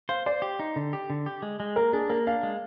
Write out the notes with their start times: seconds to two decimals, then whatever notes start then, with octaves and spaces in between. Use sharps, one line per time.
0.09 C5 F5
0.26 C5 D5
0.42 G4
0.59 D#4
0.76 D3
0.93 G4
1.10 D3
1.26 G4
1.42 G#3
1.60 G#3
1.76 A#3 A#4
1.93 D4 G#4
2.09 A#3 A#4
2.27 D4 F5
2.43 G#3